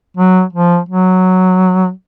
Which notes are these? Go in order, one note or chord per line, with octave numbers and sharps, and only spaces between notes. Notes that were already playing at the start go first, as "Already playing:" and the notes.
F#3
F3
F#3